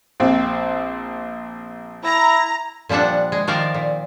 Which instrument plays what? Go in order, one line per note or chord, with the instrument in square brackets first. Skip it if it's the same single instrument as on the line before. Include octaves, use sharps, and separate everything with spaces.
[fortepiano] A#1 C4
[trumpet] E4 [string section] A#5
[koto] A#2 F3 G3 D4 F#5
G#3
D#3 F3 A#4 D5 F5
A#2